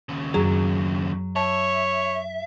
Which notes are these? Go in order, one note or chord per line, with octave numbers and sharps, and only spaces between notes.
D#2 C#3
F#2 F#3 G#4
C#5 E5 A5